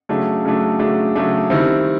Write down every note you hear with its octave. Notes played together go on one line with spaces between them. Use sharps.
C#3 F#3 A3 D4
C#3 F#3 A3 D4
C#3 F#3 A3 D4
C#3 F#3 A3 D4
D#3 G3 C4 E4